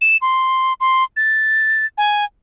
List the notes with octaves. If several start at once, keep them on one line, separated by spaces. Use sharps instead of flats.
E7
C6
C6
A6
G#5